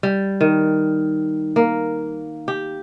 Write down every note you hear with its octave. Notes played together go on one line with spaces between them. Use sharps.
G3
D#3
A#3
G4